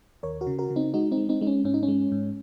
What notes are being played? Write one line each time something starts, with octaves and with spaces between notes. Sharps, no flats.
D#2 A#4 C#5
F#4 A#4
C#3
F#4 A#4
C#3
C4 D#4
G#3 D#4 F#4
C4 D#4
G#3
C4 D#4
G#3 D#4
C#4
G#2 C#4
D#4
C#4
G#3
G#2